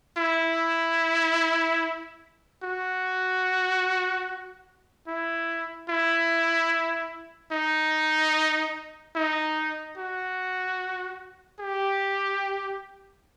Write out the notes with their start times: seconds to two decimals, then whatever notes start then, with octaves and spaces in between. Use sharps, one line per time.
0.18 E4
2.64 F#4
5.08 E4
5.90 E4
7.52 D#4
9.16 D#4
9.98 F#4
11.60 G4